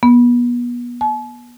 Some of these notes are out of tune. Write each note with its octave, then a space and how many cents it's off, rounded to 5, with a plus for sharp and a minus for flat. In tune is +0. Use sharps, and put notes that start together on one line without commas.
B3 -30
A5 -45